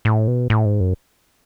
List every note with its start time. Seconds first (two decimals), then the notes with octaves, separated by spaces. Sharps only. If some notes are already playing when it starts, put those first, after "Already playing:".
0.05 A2
0.28 B2
0.50 A2
0.65 G#2
0.80 F#2